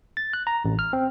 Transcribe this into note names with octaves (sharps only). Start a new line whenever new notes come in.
A6
F#6
A#5
A1
F6
C4